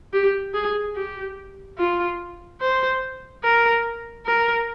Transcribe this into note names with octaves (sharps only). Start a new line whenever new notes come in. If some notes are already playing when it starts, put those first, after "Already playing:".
G4
G#4
G4
F4
C5
A#4
A#4